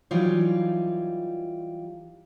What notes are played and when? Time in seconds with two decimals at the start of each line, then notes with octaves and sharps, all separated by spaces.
0.11 E3 F#3 G3 D#4 F4